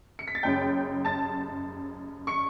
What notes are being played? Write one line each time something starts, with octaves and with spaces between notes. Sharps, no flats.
C#7
B6
A6
F#1 F#2 C#3 G5 G6
A5 A6
C#6 C#7